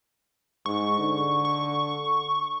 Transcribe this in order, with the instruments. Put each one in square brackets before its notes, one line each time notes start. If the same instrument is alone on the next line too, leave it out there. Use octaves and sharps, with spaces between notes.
[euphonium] G#2 [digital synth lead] C#6
[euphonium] D3
[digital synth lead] C#6